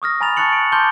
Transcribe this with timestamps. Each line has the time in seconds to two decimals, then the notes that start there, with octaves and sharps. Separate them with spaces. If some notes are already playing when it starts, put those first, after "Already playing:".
0.02 C#6 D#6 F6 A#6
0.21 G#5 A#5 B5 A6 F7
0.36 A5 C#6 F#6 A6 C#7 F#7
0.53 D7
0.72 A5 C6 D6 F6 G6 G7